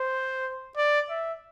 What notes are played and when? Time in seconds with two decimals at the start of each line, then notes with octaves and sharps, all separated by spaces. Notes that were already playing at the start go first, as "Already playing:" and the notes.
Already playing: C5
0.77 D5
1.10 E5